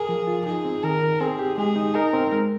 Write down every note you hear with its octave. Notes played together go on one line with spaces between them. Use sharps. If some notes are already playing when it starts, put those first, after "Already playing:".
Already playing: G#4 A#4
F3
F4
D#4 G#4
C4
D#3 A#4
D#4
C4 G#4
G4
G#3 G#4
D#4
D#4 A#4
C4
G#3